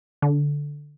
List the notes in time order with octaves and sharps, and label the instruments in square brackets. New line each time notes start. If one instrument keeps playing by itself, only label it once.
[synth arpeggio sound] D3